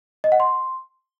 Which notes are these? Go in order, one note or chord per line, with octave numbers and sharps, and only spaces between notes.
D#5
F#5
C6